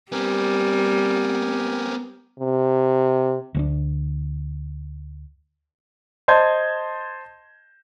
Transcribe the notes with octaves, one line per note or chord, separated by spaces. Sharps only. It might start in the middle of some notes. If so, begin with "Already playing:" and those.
G3 B3 C4 G4 A#4 G#5
C3
D2 G#3 D4
C5 D#5 A5 C6 G6 G#6